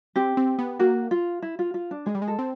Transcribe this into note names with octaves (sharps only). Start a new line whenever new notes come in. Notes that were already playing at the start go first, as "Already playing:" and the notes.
C4 G4
C4
B3
A#3 F#4
F4
E4
F4
F4
D4
G#3 G#4
G3
G#3
A4
C4